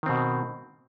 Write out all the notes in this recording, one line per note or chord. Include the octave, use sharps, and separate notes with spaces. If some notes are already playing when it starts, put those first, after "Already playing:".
B2 D#3 C4